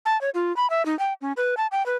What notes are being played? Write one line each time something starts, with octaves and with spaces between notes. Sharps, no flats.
A5
C#5
F4
B5
E5
D#4
G5
C#4
B4
A5
G5
B4